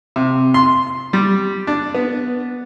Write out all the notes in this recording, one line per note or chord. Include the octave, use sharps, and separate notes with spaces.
C3
C6
G3
D4
B3